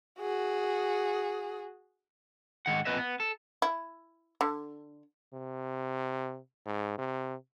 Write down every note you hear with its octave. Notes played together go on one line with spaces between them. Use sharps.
F#4 G#4
G#2 D#3 F#5
F2 A#2 B3 B4 D#5 E5
B3
A4
E4
D3
C3
G#2
C3